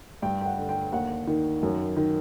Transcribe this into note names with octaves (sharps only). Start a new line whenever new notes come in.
G2 G5
G5
F#5
D3
G5
D#2 F#5
D#3
F#2
D#3